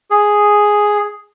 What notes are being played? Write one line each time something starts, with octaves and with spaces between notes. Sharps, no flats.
G#4